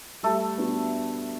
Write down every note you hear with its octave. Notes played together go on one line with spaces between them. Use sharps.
G3 A3 A4
B3 D4 F#4